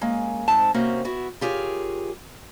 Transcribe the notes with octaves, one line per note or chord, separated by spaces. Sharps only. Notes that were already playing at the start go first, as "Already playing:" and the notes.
G#3 A#3 C#4
G#2 C4 A5
C3 A#3 C4 C#4 F#4
B3 E4 F#4
F4 G4 G#4 A#4 C#5